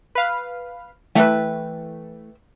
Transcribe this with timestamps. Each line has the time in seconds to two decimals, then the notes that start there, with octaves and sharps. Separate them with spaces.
0.15 B4 F5
1.15 E3 A3 B4 E5 G5